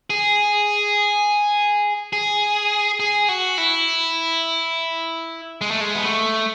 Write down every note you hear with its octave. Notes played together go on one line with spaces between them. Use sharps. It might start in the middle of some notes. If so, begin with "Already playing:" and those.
G#4
G#4
G#4
F#4
E4
G#3
A3
G#3
B3
A3